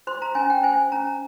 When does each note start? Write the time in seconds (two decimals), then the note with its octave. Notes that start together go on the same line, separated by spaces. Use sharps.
0.07 C5 C6
0.22 A#5
0.35 C#4 G#5
0.50 G5
0.63 C5 G#5
0.92 C#4 A#5